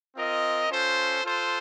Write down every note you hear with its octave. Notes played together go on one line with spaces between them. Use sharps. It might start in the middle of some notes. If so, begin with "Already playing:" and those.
C4 F4 A#4 D#5
C#4 F4 A4 C5
F4 A4 C5